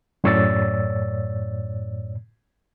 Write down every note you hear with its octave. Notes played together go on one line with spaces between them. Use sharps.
F#2 A2 C#5 D5 E6 A6